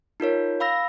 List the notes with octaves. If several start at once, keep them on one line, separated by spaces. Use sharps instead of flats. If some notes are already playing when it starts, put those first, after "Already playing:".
D#4 F4 A#4 C#5
F5 B5 E6 A#6